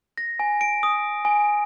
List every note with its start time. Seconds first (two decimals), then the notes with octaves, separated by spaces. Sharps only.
0.18 A#6
0.40 G#5
0.61 D7
0.83 D#6
1.25 G#5